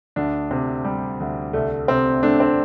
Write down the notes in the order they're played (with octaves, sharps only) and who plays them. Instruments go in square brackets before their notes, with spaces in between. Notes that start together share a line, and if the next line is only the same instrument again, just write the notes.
[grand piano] D2 D4
C3
G3
D2
C2 A3
C3 C4
A3 D4
C4